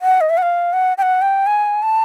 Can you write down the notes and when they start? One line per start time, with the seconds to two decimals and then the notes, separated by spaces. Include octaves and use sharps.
0.02 F#5
0.21 D#5
0.30 E5
0.38 F#5
0.42 F5
0.73 F#5
0.98 G5
1.02 F#5
1.22 G5
1.47 G#5
1.83 A5